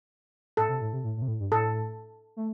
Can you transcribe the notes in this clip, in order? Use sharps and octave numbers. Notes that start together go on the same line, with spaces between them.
A2 A4
C3
A2
C3
A2
A2
C3
A2
G2
A2 A4
A3